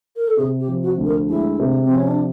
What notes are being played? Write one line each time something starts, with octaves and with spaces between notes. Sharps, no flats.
A#4
A4
C3 G#4
G4
F3
F#4
D2
A#4
G#3 E4
C3
C4
F3
C#4
D4